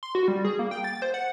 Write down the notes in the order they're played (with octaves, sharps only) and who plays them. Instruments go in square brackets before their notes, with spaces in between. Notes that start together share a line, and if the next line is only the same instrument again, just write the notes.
[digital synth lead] C6
F#4
G3
G#4
A#3
G5
A6
C5
F#5